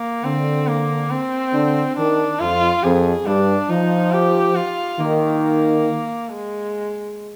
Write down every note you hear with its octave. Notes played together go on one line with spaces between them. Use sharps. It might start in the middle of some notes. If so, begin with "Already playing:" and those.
Already playing: A#3
D3 C4
A#3
C4
D3
D#3 D4
F2 F4
F2 G#4
G2 D4
F3 D#4
G4
F4
D#3 A#3
G#3